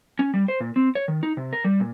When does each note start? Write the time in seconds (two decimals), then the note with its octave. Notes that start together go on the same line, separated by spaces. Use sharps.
0.19 C#4
0.34 G3
0.48 C5
0.60 A#2
0.76 C4
0.95 C#5
1.08 D#3
1.23 D#4
1.37 C3
1.53 A#4
1.64 G3
1.80 A#2